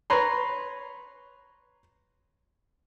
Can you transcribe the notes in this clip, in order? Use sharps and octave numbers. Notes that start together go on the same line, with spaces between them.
B4 C#5 A#5 C6